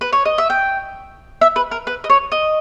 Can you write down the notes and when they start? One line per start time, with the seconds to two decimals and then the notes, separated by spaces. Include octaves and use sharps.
0.01 B4
0.13 C#5
0.25 D#5
0.38 E5
0.50 G5
1.41 E5
1.56 B4
1.71 A#4
1.87 B4
2.04 D#5
2.10 C#5
2.32 D#5